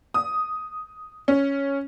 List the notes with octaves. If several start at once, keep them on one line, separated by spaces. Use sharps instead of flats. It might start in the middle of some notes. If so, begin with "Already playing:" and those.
D#6
C#4